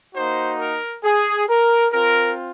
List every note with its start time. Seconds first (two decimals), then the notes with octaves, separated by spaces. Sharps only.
0.14 A#3 D#4 F#4 C5
0.58 A#4
1.03 G#4
1.47 A#4
1.91 C4 F4 A#4